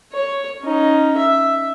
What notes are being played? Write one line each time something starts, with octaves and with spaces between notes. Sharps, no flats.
C#5
C#4 D#4
E5